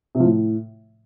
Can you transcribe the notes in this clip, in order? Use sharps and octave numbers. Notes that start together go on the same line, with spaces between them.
C3
F3
A2